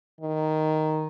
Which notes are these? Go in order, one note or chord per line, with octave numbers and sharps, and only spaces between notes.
D#3